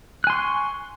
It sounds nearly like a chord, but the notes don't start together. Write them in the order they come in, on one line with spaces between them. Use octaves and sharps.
F#6 G#5 C6 C#6